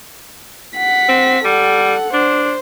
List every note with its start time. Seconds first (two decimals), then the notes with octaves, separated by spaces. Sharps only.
0.77 F#5 B6
1.09 C4
1.45 G3 A4 F#5
2.13 D4 C5